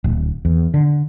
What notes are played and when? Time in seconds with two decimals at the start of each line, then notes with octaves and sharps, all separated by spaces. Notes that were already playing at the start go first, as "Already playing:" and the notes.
0.04 D1
0.45 E2
0.74 D3